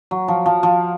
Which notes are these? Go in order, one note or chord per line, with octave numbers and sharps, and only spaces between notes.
F#3
F3
F3
F3